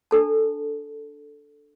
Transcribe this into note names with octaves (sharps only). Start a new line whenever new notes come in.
D4 A4 A5